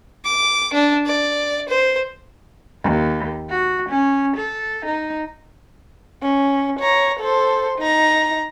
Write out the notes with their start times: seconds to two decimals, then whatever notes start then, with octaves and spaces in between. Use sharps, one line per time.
0.25 D6
0.73 D4
1.06 D5
1.69 C5
2.82 D#2
3.50 F#4
3.89 C#4
4.37 A4
4.86 D#4
6.22 C#4
6.79 C#5 A#5
7.20 A4 C5
7.78 D#4 A#5